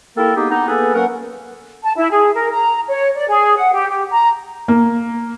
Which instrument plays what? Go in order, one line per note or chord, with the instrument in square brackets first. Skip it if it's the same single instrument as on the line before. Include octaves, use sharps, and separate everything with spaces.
[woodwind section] A#3 E4 G4 A4 A#4
A#3 B3 D#4 G4 G#4
B3 D#4
A#3 B3 G#4 A4 B4
F#3 A#3 C#4 A#4 B4 F#5
[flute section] A5
E4
G#4
A#4
A#5
C#5
D5
G#4
F#5
G4
G4
A#5
[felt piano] A#3